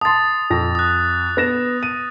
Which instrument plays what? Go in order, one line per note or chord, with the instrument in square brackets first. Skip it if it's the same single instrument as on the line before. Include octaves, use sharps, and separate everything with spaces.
[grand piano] A5 C6 [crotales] D#6 A6
[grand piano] F2 A#6
[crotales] D#6 F#6
[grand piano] B3 A#6 E7
D#7